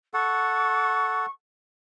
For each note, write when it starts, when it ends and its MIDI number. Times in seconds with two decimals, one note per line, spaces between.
0.14 1.26 69
0.14 1.26 78
0.14 1.30 85